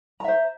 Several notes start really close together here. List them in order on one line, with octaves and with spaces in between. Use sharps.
A#5 E5 C5